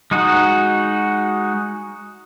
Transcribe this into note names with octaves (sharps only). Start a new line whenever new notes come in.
G#3 D#4 F#4